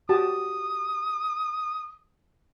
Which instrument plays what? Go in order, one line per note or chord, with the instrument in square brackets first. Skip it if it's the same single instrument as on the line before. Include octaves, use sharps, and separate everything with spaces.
[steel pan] F#4 G4 A5 [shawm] D#6